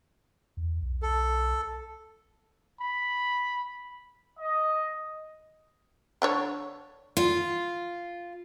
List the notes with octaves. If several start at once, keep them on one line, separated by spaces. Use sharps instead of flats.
E2
B1
A4
B5
D#5
D3 D4 C#5
F4